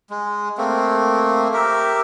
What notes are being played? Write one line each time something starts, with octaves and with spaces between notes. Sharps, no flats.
G#3
A3 A#3 C4
G4 A#4 E5